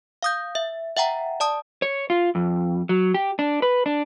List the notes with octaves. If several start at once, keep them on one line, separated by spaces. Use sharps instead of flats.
F5 D#6 G6
E5
E5 F#5 G5 A#5
D5 A5 D#6
C#5
F4
F2
F#3
G4
D4
B4
D4